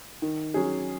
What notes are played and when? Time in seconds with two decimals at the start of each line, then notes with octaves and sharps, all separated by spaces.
0.22 D#3
0.54 F#3 C#4 G#4